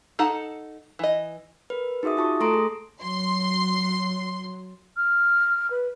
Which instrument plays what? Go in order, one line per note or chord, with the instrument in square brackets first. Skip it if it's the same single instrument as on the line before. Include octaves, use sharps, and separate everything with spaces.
[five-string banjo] D#4 A4 F#5 A5
E3 D#5
[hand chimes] A#4 B4
D#4 F#4 G#4 E5 D#6
F4 A5 C#6
A3 A4 A#5 C6 D#6 D7
G#4
[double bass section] F#3 [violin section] C6
[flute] F6
B4